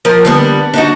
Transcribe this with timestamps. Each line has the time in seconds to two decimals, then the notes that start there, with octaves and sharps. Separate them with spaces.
0.05 F3 A#4
0.25 D3 G3 B3
0.74 D4 D#4 F#4